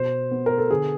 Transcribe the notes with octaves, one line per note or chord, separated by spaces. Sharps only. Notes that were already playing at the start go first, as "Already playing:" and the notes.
Already playing: B2 C5
B3
A#4
A4
D3 G#4